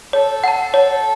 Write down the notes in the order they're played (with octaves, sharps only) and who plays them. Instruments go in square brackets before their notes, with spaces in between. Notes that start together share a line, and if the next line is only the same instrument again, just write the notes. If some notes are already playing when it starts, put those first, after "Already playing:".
[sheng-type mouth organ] A4 [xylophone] C#5
[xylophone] F#5 A5
C#5